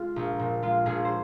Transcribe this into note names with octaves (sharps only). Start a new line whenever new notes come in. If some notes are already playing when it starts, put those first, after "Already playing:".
Already playing: G#3 F4
A#1
A#2
G#3 F4
A#1 G#4
C5